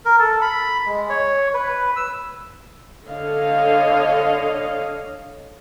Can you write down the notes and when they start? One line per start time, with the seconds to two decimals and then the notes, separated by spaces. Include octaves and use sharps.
0.05 A#4
0.18 A4
0.42 B5
0.86 G#3
1.09 C#5
1.54 B4
1.96 E6
3.08 D3 A4 C#5 D#5 F5